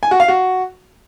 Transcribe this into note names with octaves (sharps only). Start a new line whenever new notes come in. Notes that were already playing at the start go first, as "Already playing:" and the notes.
G#5
F#4
F5
F#4